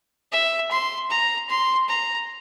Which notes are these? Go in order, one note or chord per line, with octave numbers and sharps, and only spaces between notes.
E5
C6
A#5
C6
A#5